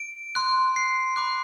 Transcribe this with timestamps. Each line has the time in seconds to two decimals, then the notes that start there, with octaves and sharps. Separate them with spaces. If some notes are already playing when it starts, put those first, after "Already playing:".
Already playing: D7
0.35 C6 F#6
0.76 C7
1.16 B5 D6 F#6